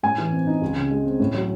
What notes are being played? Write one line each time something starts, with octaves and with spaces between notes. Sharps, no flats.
A2 G#5
E3
C4
D#4
C#2
C#3
G#3
C4
A2
F#3